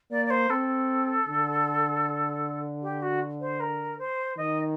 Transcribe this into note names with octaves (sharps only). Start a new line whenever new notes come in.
A#3 D5
D5
C5
C4 A4
D3
G4
F#4
C5
A#4
C5
D#3 D#5